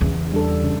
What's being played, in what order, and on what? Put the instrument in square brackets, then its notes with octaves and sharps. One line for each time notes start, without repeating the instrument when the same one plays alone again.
[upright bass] E2 [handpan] C#3
[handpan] G3 D4 A4
C#3